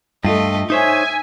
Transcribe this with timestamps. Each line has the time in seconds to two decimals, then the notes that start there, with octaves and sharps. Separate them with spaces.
0.25 G2 A3 F4 D#5
0.70 D#4 C5 C#5 E5 G#5